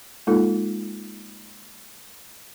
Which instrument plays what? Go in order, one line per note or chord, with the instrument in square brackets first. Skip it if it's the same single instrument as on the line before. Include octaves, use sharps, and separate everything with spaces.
[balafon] G#3 A#3 D#4 F4 A4